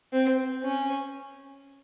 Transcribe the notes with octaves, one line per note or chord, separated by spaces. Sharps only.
C4
C#4